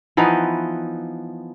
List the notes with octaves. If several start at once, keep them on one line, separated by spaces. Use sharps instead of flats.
E3 F3 B3 D#4